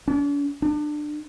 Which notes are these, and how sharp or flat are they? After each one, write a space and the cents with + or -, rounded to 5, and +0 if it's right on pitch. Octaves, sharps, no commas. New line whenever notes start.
D4 -45
D4 +25